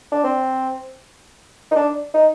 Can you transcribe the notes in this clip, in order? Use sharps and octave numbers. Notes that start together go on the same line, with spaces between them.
D4
C4
D#4
D4
D#4